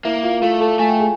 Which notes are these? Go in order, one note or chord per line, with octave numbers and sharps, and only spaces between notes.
A#3 E4 E5
F4 F5
A3 F4 F5
A4 A5
A3 G#5
G5
G#4 G#5